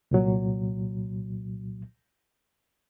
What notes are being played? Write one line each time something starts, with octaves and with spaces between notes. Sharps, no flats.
C2 A#2 F#3